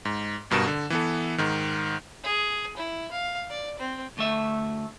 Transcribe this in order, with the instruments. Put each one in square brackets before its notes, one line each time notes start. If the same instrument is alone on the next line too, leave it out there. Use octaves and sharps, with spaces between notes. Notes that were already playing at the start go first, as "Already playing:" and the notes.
[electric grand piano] G#2
G#1 G2 B2 A#4 E7
D3
E3 B3 A4
G#2 D#3
[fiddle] G#4
E4
F5
D5
C4
[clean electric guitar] D2 A3 E5